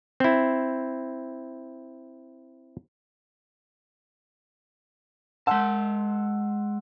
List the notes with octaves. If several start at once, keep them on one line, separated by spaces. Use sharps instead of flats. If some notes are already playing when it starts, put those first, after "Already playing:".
C4 E4
G#3 F#5 A5 C6 E6